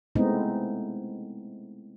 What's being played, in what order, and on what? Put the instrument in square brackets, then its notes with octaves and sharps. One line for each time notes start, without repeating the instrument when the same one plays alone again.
[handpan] G#3 A3 B3 C4 D#4 E4